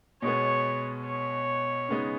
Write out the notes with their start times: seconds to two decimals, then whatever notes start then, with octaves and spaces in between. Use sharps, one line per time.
0.22 B2 G#3 B3 C#5
1.06 C#5
1.89 C#3 G#3 B3 D#4